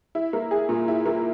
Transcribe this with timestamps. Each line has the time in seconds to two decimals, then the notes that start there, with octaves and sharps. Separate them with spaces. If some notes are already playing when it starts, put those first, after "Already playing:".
0.15 E4
0.33 A#3
0.51 G#4
0.69 A#2
0.88 E4
1.06 A#3